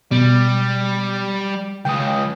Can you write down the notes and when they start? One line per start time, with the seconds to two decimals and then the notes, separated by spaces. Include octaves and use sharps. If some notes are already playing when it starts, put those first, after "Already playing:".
0.11 B2 G3
1.85 C#2 G5 D#6